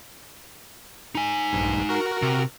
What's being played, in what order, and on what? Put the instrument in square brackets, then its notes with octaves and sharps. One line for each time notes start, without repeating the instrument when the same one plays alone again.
[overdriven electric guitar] D#4 G#5
[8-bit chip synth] A#1 G2
F#4 A#4
[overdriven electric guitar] C3